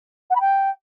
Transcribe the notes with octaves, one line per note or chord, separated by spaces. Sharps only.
F#5
B5
G5